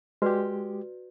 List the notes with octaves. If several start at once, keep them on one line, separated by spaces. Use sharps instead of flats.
G#3 F#4 G4 B4 D5